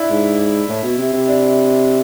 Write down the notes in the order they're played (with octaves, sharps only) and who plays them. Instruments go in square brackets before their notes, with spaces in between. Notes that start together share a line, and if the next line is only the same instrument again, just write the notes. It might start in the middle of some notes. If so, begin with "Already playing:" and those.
Already playing: [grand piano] D4 E4
[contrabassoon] G#2
A2
B2
C3
C3
[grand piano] D4